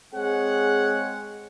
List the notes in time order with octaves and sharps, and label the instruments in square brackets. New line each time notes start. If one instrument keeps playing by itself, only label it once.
[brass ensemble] G#3 C4 G#4 C#5 F#5